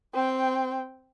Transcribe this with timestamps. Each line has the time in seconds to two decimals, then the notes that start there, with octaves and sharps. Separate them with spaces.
0.14 C4 G5